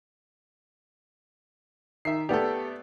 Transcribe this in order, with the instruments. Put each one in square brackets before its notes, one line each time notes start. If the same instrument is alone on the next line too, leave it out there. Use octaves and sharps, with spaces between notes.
[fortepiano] D#3 E5 [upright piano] C7
[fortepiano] A3 B3 D5 [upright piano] G4 A4